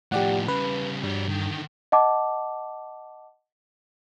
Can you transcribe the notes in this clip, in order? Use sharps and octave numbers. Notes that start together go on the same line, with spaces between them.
A2 F3 G4 D5 F#5
C#3 G3 B4
G2 G3 F#4
D3 D#3
D#5 F#5 A5 D6